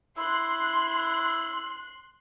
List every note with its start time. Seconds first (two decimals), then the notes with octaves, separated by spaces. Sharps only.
0.18 E4 C6 F#6